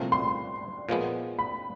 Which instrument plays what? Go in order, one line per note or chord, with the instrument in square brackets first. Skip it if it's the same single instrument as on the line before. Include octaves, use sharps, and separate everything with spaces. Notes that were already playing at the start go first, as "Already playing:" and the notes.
Already playing: [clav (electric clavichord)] C2 A#2 F3 A3 C4
[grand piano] C6
[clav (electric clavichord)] A#2 F3 G#3 B3
[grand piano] B5